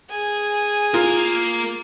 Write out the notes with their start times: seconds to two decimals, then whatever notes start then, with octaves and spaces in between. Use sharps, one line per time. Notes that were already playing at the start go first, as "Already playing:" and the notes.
0.10 G#4 G#5
0.94 A#3 F4 A#4